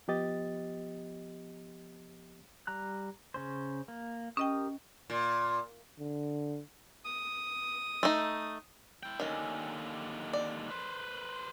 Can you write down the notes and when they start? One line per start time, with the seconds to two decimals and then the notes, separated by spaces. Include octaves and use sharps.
0.08 F3 B3 G4 D#5 A6
2.67 G3 A#5 F#6
3.34 C#3 C#4 C5
3.88 A#3
4.37 C#4 G4 A#4 D#5 G5 D#6
5.10 A#2
6.00 D3
7.05 D#6
8.03 A3 D#4
9.03 E4 G5
9.20 D#2 D3 D#3 C#4
10.33 D5
10.71 B4 C5